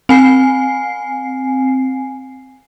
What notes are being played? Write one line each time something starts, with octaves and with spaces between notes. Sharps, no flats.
C4 G#5 C7